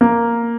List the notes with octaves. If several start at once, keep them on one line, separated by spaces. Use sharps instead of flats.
A#3